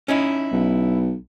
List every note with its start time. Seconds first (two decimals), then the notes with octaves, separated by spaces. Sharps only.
0.08 C#4 D#4 E4
0.52 B1